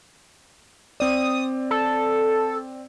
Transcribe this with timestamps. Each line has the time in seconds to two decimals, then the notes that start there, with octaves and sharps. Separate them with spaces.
1.00 C4 D5 D#6
1.71 A4